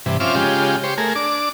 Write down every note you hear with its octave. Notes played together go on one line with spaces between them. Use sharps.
G2 C3 E3
F3 C4 C#4 E5 D6 F6
C#3 G#3 F4 G4
G4 C5 C#5
A3 G#4 A#4
D4 D6